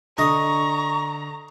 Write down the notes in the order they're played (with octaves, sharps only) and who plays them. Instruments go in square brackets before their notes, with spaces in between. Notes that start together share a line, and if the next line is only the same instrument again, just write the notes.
[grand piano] D3 [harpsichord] D#5 [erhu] A#5 [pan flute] C#6